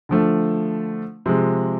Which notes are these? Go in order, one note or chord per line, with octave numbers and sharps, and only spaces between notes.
D3 F3 A3
C3 F3 G#3